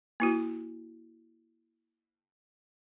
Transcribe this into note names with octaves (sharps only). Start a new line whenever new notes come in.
A#3 E4 F#4